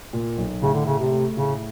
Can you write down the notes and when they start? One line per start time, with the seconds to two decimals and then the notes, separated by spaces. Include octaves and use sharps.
0.13 A#2
0.37 B1
0.62 A2 C#3
0.74 D3
0.86 C#3 A3
0.99 C3
1.11 A3
1.36 A2 C#3